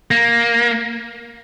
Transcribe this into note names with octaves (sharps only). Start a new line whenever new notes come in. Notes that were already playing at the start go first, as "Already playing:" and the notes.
A#3